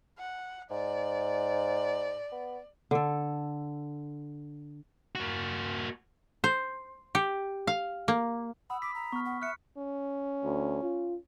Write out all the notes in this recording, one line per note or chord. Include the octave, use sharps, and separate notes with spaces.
F#5
G#2 D5
B3
D3 A4
A#3 F#4
C5
G4
F5
A#3
F#5 B5 D#6 E6
D6 B6
A#5
B3 C#6 F6
F#5
E5 F6 F#6 C#7
C#4
D2
F4